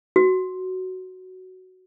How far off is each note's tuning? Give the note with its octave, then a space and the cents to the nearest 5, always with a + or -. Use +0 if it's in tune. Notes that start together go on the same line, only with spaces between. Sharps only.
F#4 +5